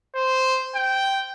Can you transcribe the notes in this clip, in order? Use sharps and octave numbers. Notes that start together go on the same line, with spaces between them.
C5
G5